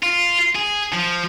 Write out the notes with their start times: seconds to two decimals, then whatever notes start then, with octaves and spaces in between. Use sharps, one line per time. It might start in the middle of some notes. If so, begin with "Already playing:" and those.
0.03 F4
0.56 G#4
0.93 F3